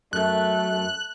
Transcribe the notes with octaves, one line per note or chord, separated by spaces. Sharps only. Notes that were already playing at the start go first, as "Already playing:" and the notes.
F#2 A3 F#6